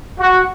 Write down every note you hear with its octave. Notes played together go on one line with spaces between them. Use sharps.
F#4